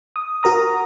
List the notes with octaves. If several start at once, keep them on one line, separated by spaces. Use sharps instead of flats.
D#6
F#4 A#4 A#5 D#6